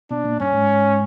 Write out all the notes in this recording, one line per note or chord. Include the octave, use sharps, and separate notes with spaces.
B2 D4
A#2
G2 C#4
G#2